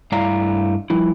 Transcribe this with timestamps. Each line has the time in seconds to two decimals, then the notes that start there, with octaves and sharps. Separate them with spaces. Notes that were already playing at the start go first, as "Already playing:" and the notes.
0.12 G2 A3 E4 D5 F5 A#5
0.90 F3 G3 E4